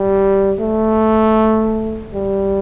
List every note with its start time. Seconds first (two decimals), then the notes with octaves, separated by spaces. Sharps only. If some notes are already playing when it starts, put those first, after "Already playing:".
Already playing: G3
0.59 A3
2.14 G3